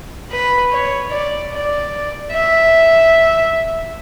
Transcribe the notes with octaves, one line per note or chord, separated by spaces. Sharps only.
B4
C#5
D5
D5
E5